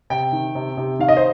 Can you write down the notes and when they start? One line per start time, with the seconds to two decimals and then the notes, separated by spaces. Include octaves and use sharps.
0.10 C3 G5
0.32 D#3
0.55 C3
0.77 C3
0.99 D#3 F5
1.08 D#5
1.17 C5